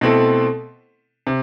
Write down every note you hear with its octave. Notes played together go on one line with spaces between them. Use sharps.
B2 A3 C4 E4 A4
C3